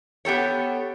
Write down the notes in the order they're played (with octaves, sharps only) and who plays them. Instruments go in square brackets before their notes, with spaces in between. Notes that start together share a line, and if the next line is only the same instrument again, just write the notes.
[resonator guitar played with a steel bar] B3 G4 A4 C#5